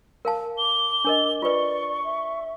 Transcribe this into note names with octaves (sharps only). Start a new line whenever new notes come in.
A#4 F5 A5
D6 G7
D4 A#4 D#5
F4 B4 D5 C#6
E5